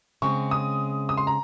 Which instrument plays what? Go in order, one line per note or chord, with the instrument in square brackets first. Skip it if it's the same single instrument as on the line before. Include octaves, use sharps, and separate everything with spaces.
[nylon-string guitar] C#3 G#3 C4 [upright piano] C#6
[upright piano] D#6
D#6
C6
A#5